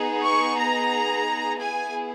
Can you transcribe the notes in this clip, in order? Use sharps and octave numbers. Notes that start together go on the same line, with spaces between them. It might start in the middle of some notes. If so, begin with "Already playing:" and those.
Already playing: B3 D#4 G#4
C#6
A#5
B3 E4 G#4 G#5